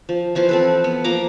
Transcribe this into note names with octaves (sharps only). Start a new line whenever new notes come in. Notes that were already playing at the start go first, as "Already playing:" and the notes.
F3
E3 F3 C5 C6
C4 A4 B4
B3
F3 A#3 A#5 D6